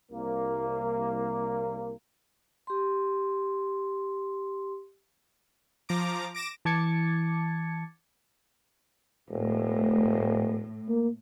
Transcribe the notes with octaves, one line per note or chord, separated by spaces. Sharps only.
C2 A#3
G4 C6
F3 A#5 D6
D6 A#6 D7 E7
E3 A5 D6 G#6 A6 C#7
E1 A2
A#3